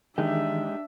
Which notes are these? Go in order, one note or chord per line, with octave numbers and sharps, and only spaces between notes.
D#3 E3 G#3 D4 D#4 G4 G#4 E5